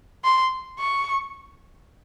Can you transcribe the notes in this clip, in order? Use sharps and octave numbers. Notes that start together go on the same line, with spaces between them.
C6
C#6